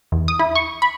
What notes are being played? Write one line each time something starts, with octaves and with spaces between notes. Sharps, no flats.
E2
D#6
E4
C#6
B5